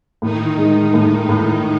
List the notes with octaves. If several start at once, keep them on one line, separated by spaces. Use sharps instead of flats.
A2 D#3 D#4
D#3 G#3 D#4
A2
A2